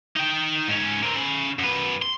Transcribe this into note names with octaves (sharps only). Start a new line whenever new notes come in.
D#4 G5
G#2 C#4
A#3 C4
C#4 B5
F#2 B4
C6